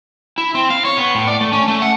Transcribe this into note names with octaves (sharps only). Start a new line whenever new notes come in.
E4
C4
F5
C#5
B3
A2
D5
A3
C#4
A3
F#5